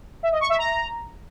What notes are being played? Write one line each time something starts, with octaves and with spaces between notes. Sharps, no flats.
E5
D#5
C#6
E5
A#5